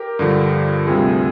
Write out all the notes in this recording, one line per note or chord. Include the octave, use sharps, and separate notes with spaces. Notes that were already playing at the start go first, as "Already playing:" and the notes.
Already playing: G4 A#4
G2 D3 F3
D2 C3 G3 F4 G#4